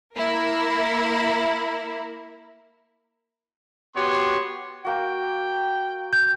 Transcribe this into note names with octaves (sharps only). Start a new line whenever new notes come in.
A#3 E4 A#4
B3 F#4 G4 C#5 C6
A#3 F#4 G5
G6